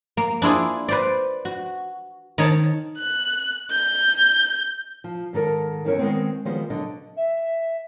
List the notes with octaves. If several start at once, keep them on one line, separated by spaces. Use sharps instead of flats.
A#3
D4 E4 F4 G#4
B4 C5 D5
F#4
D#3 C#5 A5
F#6
G6
F3
G#2 D#3 A4 A#4
E2 G2 E3 C#4 A#4 C#5
D#3 G#3 B3 C4
D#3 F3 G3 G#3 B3 C5
D3 F#3 D#5
E5